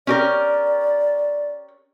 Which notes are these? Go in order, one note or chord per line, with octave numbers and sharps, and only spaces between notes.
C#4 G4 A#4 D5